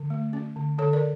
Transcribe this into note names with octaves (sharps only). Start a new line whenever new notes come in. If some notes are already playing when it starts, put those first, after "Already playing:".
Already playing: D3
A3
C#4
D3
D3 A4 C#5
A#4 D5